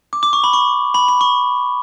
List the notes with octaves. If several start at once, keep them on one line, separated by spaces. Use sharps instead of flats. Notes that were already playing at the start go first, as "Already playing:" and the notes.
D6
D6
C#6
B5
C#6
B5
B5
C#6